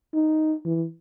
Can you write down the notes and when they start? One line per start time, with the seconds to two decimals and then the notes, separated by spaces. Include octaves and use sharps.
0.14 D#4
0.65 E3